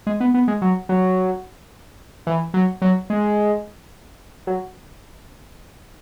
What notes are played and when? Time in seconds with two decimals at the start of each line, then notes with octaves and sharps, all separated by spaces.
0.07 G#3
0.20 B3
0.34 B3
0.48 G#3
0.62 F#3
0.89 F#3
2.27 E3
2.54 F#3
2.82 F#3
3.10 G#3
4.47 F#3